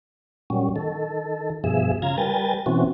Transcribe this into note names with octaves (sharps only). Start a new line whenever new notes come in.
A#2 F#3 G3 C#4
D#3 A4
G2 B2 F3 G#4 E5
C#3 F4 F5 A#5 G#6
G3 A#4 B4 G5 G#5 A6
B2 E3 C4 C#4 F#4